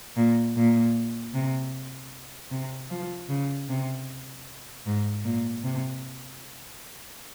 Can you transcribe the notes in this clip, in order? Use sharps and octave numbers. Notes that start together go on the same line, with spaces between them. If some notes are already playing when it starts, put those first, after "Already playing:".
A#2
A#2
C3
C3
F3
C#3
C3
G#2
A#2
C3